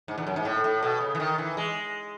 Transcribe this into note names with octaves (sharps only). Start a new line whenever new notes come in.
G#2
E2
F#2
G#2
A2
A2
B2
C#3
E3
D#3
E3
G#3